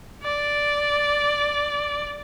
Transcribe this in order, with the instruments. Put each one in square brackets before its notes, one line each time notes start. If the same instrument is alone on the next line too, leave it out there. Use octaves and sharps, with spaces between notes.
[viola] D5